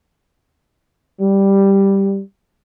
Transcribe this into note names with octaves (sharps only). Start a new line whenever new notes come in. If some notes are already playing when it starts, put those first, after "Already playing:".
G3